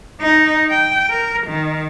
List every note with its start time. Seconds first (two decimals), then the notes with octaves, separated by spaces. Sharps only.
0.21 D#4
0.70 G5
1.10 A#4
1.48 D#3